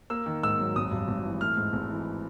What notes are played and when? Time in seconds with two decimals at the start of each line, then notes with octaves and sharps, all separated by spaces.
0.10 A#3 E6
0.26 D#3
0.43 G#2 E6
0.59 F#3
0.76 G#1 D#6
0.91 G2
1.08 G#1
1.24 E3
1.41 A3 F6
1.57 G#2
1.73 G#1
1.90 E3